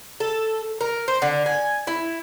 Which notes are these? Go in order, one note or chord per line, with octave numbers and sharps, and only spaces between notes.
A4
A#4
C5
D3
G#5
E4